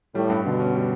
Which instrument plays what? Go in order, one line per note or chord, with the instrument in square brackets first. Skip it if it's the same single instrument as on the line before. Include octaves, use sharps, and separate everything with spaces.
[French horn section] A2 [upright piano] G3
[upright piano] G2
[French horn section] B2 [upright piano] D3
[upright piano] C#4
G3